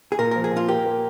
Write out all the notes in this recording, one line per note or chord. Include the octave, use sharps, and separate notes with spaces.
G#4
A#2 A#4
F3 A#4
G#4
A#2 F4
G4 A#4
A#3